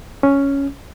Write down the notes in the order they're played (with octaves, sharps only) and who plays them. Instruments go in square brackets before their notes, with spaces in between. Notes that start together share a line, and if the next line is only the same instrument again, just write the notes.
[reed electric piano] C#4